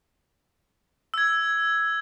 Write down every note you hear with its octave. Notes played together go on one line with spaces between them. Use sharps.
E6 G#6